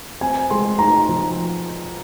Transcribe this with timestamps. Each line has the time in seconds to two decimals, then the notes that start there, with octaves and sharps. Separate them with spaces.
0.21 C4 G#5
0.50 G#3 C6
0.79 D#4 A#5
1.09 F3